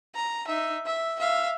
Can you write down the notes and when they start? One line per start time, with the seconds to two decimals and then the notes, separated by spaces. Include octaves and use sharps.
0.15 A#5
0.47 D#4 E5
0.86 E5
1.20 E5 F5